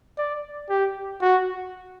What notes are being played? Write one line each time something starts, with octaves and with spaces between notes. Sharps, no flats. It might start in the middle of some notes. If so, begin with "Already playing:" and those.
D5
G4
F#4